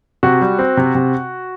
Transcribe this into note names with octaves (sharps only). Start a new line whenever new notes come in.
C3 F#4
G3
C4
C3
C3